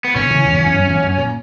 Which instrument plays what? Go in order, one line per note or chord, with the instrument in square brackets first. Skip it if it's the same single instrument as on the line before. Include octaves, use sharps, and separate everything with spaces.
[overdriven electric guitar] B3
[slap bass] B2 D3 [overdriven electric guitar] C#4
[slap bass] C#3 E3
E2 G2
E2
F#2
E2
F#2
A#2